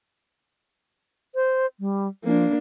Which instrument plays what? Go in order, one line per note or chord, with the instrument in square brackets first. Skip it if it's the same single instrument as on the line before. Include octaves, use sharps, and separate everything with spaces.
[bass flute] C5
G3
[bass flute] F3 [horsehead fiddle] A#3 D4